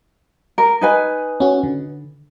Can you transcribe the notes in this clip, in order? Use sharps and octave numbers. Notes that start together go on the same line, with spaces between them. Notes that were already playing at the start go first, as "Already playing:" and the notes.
A#4
D#4 B4 G#5
C#4 F#4
D3